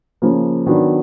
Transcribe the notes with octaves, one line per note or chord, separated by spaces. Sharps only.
C#3 F3 A#3
D#3 F#3 B3 D4 F#4